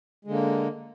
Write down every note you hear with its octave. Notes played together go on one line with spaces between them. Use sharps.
D3 G#3 A#3